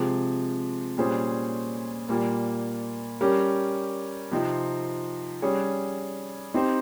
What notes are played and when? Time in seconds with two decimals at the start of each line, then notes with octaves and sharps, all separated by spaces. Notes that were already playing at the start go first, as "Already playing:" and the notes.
Already playing: C3 F3 G#3
0.98 A#2 G3 C#4 G#4 C5
2.09 A#2 G3 A#3
3.21 G3 C#4 G4 A#4
4.31 C3 F3 C4 D#4
5.42 G3 C#4 G#4 C#5
6.54 C4 D#4 G4 C5